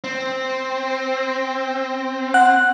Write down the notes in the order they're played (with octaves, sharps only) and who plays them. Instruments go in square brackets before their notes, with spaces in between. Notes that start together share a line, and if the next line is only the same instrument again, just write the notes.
[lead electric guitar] C4
[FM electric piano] F#5 F#6